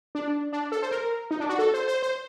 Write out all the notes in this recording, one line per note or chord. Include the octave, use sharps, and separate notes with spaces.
D4
D4
A4
C5
A#4
D#4
D4
F#4
A4
C5
C5
C5